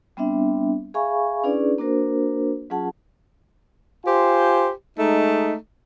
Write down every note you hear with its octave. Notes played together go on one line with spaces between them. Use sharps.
G3 B3 C4 D4 E5
G#4 E5 F5 G#5 B5 C#6
C#4 D4 E4 G#4 B4 D5
A#3 D4 F#4 A#4 C5
F#3 C#4 F4 G#4 F#5 A5
F4 G4 C5 G#5
G#3 A3 D#4